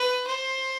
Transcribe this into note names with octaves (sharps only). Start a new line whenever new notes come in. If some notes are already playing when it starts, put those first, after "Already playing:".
Already playing: B4
C5